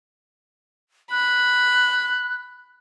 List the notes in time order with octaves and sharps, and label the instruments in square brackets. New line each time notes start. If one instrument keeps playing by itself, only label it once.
[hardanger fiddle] B5 [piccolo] F#6